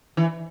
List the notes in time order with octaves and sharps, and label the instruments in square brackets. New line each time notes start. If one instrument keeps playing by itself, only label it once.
[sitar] E3